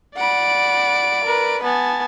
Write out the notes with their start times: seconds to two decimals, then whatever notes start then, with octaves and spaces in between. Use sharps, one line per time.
0.16 D5 F#5 B5 D7
1.24 A#4 B4
1.63 B3 G#5 A5